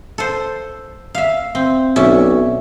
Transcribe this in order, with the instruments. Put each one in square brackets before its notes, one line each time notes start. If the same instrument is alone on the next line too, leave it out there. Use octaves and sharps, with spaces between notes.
[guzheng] A4 C5
E5 F5
C4
[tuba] B1 [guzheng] C#4 D5 E5